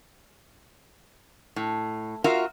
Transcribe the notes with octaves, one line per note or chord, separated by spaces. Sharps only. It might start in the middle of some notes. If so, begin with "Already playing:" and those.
A2
F4 F#4 A#4 E5 F5